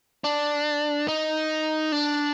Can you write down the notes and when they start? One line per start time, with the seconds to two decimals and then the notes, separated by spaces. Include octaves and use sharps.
0.24 D4
1.08 D#4
1.92 D4